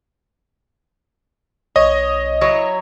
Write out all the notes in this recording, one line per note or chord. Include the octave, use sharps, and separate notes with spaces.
B1 C#5 D#5
F#3 E4 C#5